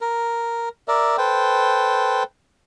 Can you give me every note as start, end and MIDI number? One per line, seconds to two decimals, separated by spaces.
0.01 0.69 70
0.88 1.17 70
0.88 1.17 74
0.88 1.17 76
1.18 2.23 69
1.18 2.23 71
1.18 2.23 72
1.18 2.23 79